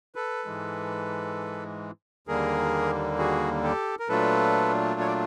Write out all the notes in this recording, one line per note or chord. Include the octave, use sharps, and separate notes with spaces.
A4 B4
G#2 E3 G#3
D#2 D3 G3 A#3 G#4 A#4
F#4 G#4
G4 A4
A#4
A#2 F#3 A3 D4 F4 A4 B4
C#5
D5